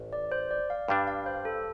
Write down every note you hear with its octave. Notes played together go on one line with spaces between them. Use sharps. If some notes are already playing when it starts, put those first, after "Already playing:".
Already playing: A1
D5
C5
D5
F5
G2 G3 D4
F5
C5
A4